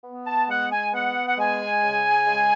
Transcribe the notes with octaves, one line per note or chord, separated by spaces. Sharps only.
B3
A5
G#3 F#5
G#5
B3 F#5
F#5
G#3 G#5
C#3
G#3